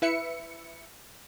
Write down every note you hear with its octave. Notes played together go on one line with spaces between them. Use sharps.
E4 B4 E5 C#7